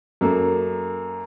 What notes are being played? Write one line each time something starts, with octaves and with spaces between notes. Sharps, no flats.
F#2 A#3 A4